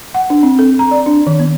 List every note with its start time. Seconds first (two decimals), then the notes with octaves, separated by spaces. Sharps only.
0.14 F#5
0.30 D4
0.43 C4
0.59 A4
0.79 A#5
0.91 D5
1.06 D4
1.27 D#3
1.39 B3